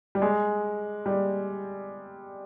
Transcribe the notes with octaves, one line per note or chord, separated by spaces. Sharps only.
G3
G#3
G3